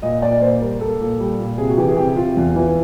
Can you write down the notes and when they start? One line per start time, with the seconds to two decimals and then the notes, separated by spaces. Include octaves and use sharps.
0.02 A#2 D#5
0.22 A#2 D5
0.41 A#3 C5
0.61 G3 A#4
0.81 A#3 A4
1.00 A#2
1.20 G3
1.39 A#2
1.58 C3 G#4
1.69 F#4
1.77 E3 G4
1.88 G#4
1.97 C3 G4
2.16 C3 F4
2.37 E2
2.56 E3